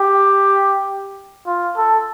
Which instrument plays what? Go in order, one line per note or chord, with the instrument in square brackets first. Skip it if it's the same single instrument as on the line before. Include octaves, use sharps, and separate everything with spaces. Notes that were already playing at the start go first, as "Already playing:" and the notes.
Already playing: [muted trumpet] G4
F4
A4